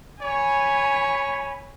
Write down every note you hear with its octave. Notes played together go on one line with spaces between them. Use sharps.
C#5 G#5 B5